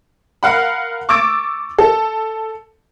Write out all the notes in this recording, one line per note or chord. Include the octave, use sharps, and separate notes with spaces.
A#4 F5 F#5 B5
C#6 D6 E6 A6 D7
A4